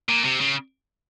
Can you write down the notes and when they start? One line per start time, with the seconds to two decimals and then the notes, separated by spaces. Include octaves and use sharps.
0.09 A#2
0.24 C3
0.40 C#3